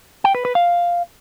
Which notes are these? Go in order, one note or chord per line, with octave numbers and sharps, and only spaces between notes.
G5
B4
B4
F5